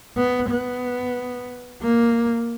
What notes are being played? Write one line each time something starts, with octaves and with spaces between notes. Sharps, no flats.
B3
B3
A#3